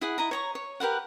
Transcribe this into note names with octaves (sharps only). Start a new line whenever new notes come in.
E4 G#4 F#5
E4 D#5 A#5
C#5 A#5 C#6
C#5
G4 A#4 B4 F#5